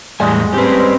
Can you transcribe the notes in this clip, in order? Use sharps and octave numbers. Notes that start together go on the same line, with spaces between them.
E2 A2 G3 G#3 G#5
C4 C#4 G4 B4